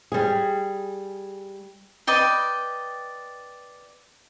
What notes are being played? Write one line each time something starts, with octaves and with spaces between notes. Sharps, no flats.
G3 G#4
B4 D5 D#5 G5